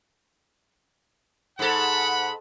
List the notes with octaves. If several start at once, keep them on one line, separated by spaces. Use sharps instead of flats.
G#2 A4 F#5 B5